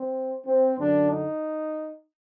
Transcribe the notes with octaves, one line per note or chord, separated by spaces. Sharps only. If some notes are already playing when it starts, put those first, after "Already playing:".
Already playing: C4
C4
F#2 D3 D4
D#4